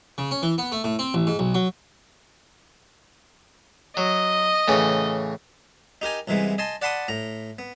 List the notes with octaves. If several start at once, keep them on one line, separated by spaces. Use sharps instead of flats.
C#3
C#4
E3
B3
A3
A2
C4
A1
G#2
B1
F#3
F#3 D#5
A2 C#3 E3
D#4 G4 A#4 G#5
C2 C3 E3 G#3 B3
D#5 G#5 A5 C6
D5 F#5 A5 B5 C6 D#6
A2 A#5
B3